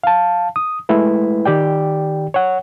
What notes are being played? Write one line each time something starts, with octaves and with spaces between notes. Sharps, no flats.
F5 A5
D#6
G#3 A3 E4 B4
D#3 G4 D5 G5
C#5 F#5